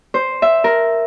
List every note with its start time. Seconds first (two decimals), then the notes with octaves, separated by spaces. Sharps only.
0.14 C5
0.42 E5
0.64 A#4